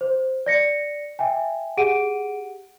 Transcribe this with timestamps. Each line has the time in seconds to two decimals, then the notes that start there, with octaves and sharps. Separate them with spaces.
0.01 C5
0.46 D5 A#6 C#7
1.19 E5 G5 G#5
1.77 G4 G#4 F#5 D7 D#7